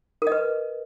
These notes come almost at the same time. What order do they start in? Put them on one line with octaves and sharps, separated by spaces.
A#4 D#5 B4